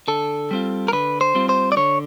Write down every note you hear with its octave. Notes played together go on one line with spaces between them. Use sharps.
D3 A4
G3 C4 F4
A#4
D3 B4
C5
G3 C4 F4
C5
D5
D3 C#5